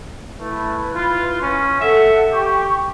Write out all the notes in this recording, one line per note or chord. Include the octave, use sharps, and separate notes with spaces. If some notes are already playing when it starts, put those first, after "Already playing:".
A3 E4 B4
F4
C#4
A4 E5 F#5
G4 G5 C#6